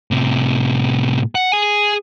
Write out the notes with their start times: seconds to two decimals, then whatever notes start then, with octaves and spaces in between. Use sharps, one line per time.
0.11 A2 C3
1.35 F#5
1.52 G#4 G#5